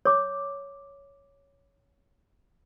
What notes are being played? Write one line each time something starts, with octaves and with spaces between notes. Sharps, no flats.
C#5 D6